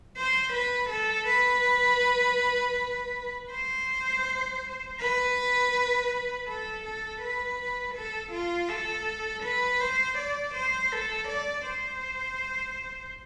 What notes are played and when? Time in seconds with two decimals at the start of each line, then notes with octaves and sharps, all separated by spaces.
0.17 C5
0.53 B4
0.91 A4
1.28 B4
3.51 C5
4.99 B4
6.48 A4
6.85 A4
7.22 B4
7.95 A4
8.33 F4
8.69 A4
9.44 B4
9.80 C5
10.18 D5
10.55 C5
10.92 A4
11.29 D5
11.67 C5